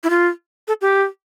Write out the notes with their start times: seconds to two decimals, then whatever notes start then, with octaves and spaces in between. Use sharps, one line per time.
0.04 E4
0.10 F4
0.68 A4
0.81 G4